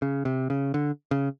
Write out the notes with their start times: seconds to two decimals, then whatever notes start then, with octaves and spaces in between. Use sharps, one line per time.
0.02 C#3
0.25 C3
0.50 C#3
0.74 D3
1.11 C#3